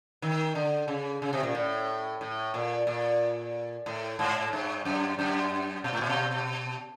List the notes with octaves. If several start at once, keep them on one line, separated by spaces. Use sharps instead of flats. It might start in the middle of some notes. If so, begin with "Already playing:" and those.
D#3
D3
C#3
C#3
C3
A#2
A2
A2
A#2
A#2
A2
G#2
G2
F#2
F#2
B2
A2
A#2
B2